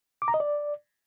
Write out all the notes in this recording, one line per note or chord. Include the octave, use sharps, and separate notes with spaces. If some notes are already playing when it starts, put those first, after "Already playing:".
D6
A#5
D#5
D5